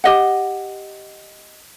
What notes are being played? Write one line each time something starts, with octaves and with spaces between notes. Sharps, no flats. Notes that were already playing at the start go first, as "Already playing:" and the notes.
G4 D#5 F#5